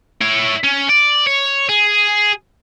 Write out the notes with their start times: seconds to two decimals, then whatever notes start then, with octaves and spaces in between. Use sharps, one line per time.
0.21 E4 C#5
0.64 C#4
0.89 D5
1.27 C#5
1.69 G#4